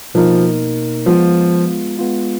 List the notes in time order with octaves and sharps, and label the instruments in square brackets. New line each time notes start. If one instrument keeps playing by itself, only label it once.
[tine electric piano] B2 A#3 D#4 A#4 [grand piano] F3
[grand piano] F3 [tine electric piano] G#3 B3 F4
[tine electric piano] G#3 B3 F4